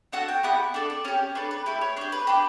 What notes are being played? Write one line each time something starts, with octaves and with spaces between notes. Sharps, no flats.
D4 F#4 A4 F#5
G5
B3 E4 G4 F#5
D4 A4 D5
D5
C#4 G4 C#5
D4 A4 B4
B4
A3 E4 G4 B4
C#5
D4 G4 C#5
B4
D4 G4 B4